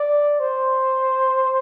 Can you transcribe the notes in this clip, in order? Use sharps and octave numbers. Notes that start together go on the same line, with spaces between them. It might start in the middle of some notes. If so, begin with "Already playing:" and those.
Already playing: D5
C5